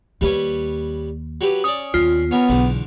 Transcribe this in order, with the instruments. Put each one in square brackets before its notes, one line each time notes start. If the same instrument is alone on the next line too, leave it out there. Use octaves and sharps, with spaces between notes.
[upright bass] D#2 A#3 [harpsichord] G3 B4 C#5
[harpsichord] F#3 G4 B4
[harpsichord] C#4 D5 [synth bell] D#6
[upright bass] D#2 B3 [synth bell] F4
[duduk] B3 [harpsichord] C#4 A#4
[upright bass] B1 [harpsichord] E2 D3